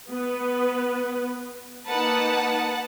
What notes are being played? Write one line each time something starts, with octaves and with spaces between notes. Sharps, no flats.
B3 B4
A#3 D#4 B4 F#5 A5